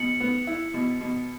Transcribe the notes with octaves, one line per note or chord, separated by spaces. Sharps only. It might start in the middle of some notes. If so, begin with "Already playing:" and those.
Already playing: B2 C#7 F#7
B3
E4
B2
B2